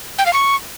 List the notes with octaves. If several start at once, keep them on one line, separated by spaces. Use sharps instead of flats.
G5
F5
C#6